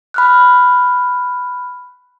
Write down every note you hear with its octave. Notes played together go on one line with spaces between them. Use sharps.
B5 F6 F#6